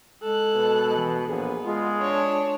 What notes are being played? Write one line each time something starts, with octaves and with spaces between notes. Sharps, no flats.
G#3 A4 F#6
B2
E3
A#1 B3 G#4
G#3 F4
D4 C#5